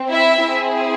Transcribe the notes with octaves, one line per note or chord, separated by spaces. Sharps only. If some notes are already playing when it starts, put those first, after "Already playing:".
Already playing: C4
E4 E5
C4 E4 G#4